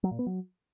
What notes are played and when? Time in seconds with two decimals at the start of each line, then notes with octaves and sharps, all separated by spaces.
0.04 F#3
0.11 A#2
0.19 B3
0.26 F#3